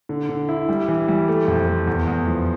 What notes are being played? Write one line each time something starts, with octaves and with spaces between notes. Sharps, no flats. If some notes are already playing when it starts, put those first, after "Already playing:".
D3
D3
E4
G3
E3
G3
A3
F2
A3
E2
E2
F3